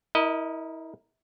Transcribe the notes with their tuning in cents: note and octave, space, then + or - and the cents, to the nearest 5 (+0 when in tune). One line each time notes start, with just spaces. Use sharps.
E4 -30 A#4 +0 D#5 +0